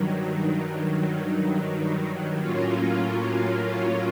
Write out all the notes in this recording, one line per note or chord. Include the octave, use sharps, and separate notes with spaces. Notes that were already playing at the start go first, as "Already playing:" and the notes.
Already playing: G2 D#3 F#3
A2 F#3 A#3 C#4 F4